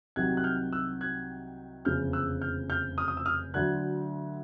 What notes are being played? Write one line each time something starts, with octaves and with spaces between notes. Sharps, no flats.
C2 C3 D#3 F#3 F#6 G#6
F#6
F6 G6
E6 F#6
F#6 G#6
F1 E2 C#3 F3 F6 G6
E6 F#6
F6 G6
F6 G6
D#6 F6
D#6
E6
D#6 F6
D2 D3 F#3 F#6 G#6